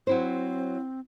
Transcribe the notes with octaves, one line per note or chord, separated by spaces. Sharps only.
F#3 C4 E4 C5